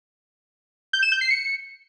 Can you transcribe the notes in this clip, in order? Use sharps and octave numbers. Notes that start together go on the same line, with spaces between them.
G6
E7
G6
C7
C#7